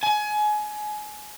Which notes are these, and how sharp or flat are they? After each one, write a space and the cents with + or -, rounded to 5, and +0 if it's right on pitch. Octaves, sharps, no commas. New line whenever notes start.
G#5 +25